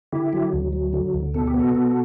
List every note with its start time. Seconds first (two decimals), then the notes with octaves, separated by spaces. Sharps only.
0.12 D3 E4 G4
0.33 F#3
0.53 D2
0.73 F#3
0.93 D3
1.14 D2
1.34 B2 A4
1.47 G4
1.54 B3
1.59 F#4 A4
1.75 B2